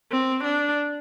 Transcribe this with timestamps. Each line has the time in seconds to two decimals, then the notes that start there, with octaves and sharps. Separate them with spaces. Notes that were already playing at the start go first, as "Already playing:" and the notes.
0.11 C4
0.44 D4